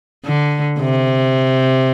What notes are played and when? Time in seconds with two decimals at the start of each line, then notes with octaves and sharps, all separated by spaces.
0.26 D3
0.80 C3